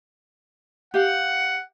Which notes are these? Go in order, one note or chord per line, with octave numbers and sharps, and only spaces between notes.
G4 F5 F#5